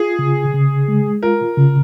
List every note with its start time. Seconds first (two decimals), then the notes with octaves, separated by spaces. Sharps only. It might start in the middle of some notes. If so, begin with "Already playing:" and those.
Already playing: F4 G#4
0.19 C#3
0.54 C#3
0.88 G#3
1.23 F4 A#4
1.57 C#3